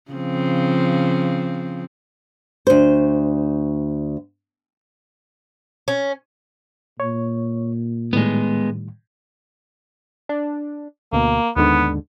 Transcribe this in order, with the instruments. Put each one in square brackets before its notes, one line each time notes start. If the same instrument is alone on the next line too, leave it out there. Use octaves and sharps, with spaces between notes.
[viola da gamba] C#3 F3 C4
[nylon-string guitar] D2 C5
[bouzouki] C#4
[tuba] A#2 [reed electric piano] C#5
[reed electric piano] A2 D#3 G3 [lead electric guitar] G#3 B3
[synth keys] D4
[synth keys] D2 B2 [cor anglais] A#3
[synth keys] D#2 G#2 D3 [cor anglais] B3